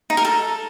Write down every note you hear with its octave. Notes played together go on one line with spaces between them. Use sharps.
D#4
A#4
A4